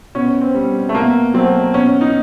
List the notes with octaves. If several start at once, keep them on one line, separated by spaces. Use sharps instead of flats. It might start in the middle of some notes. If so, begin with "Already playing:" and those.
B2 C#4
C4
G3
A3
B2 A#3
F#3 A3 C4
B2 C#4
D#4